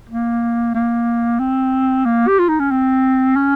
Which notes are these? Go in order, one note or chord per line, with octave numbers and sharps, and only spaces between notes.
A#3
A#3
C4
A#3
G4
F4
D#4
C#4
C4
C#4